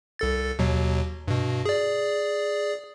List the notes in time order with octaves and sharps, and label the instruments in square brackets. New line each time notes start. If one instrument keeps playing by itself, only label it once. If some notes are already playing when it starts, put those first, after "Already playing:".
[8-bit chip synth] C2 A4 A6
D#2 B2 F#3
G2 B2
G#4 D5